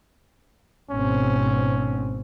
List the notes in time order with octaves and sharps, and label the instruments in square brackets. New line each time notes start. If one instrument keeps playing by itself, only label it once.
[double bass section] G#1 B2 C4 [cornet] C#4